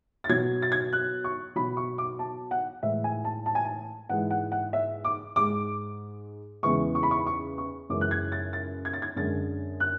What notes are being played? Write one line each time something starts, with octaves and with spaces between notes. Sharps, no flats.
A6
B2 F#3 G#6
A6
G#6
F#6
C#6
B2 F#3 B5
C#6
D6
A5
F#5
A2 E3 G#3 E5
G#5
A5
A5
G#5
A5
G#2 E3 G#3 F#5
F#5
F#5
E5
D6
G#2 G#3 D6
E2 C#3 E3 G#3 C#6
C#6
B5
C#6
C#6
C#6
F#2 C#3 E3 G#3 D6
F#6
G#6
A6
A6
G#6
A6
G#6
F#2 D3 G#3 A6
F#6